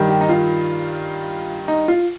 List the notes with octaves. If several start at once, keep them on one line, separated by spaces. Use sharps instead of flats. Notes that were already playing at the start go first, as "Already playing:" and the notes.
Already playing: G2 D#3
G4
D#4
F4
D#4
F4